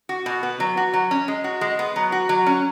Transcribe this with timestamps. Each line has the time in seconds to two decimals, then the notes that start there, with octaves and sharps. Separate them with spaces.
0.09 F#4
0.26 B2
0.43 B3
0.60 F#3
0.77 F#4
0.94 F#3
1.11 C#4
1.28 G#3
1.44 F#4
1.61 G#3
1.79 B3
1.96 F#3
2.12 F#4
2.29 F#3
2.46 C#4